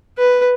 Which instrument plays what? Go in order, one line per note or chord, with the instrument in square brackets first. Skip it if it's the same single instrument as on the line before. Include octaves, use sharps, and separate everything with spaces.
[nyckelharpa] B4